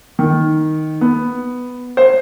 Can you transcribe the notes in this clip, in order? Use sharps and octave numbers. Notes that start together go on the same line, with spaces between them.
D#3
B3
C5